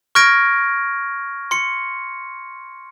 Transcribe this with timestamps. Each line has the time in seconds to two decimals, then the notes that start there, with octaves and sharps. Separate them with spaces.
0.15 C#6 F6 G6 G#6 A#6 D7
1.51 C6 C#7